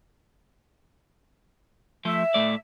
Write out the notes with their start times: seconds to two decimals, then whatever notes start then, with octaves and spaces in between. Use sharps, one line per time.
2.05 F3 A3 E5
2.34 A2 A3 D5